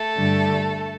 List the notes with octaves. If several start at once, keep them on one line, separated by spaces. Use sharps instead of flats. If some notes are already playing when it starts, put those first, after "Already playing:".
Already playing: A3 A4
G2 D3 G3